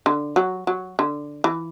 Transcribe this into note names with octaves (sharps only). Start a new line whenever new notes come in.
D3
F#3
F#3
D3
E3